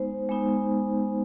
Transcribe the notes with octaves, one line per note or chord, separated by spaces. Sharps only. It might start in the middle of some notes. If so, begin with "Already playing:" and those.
Already playing: G#3 B3 D#4 C5
G#3 B3 D#4